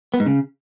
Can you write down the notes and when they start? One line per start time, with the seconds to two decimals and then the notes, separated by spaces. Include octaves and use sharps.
0.14 B3
0.20 G#2
0.26 C#3